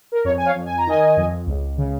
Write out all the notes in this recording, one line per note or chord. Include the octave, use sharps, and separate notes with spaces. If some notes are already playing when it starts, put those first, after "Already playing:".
A#4
F2 C#5
G#5
C#5 F5
F2
G#5
A#5
D#3 D#5 G#5
F2
C#2
C#3